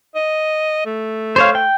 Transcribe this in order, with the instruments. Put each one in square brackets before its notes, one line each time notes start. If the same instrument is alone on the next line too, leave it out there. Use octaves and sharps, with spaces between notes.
[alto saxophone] D#5
A3
[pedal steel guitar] C5 C#5 F5
G5